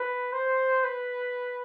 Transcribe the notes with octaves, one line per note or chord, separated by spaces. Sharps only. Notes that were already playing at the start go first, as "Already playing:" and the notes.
Already playing: B4
C5
B4